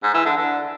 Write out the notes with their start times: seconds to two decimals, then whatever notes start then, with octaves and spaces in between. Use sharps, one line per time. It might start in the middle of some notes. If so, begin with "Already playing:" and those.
0.03 G#2
0.14 E3
0.26 D3
0.37 D3